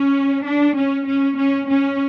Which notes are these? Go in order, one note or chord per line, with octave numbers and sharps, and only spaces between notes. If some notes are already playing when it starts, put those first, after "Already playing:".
Already playing: C#4
D4
C#4
C#4
C#4
C#4